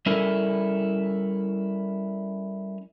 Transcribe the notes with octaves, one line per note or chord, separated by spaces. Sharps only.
G3 C#4 E4 A4 A#4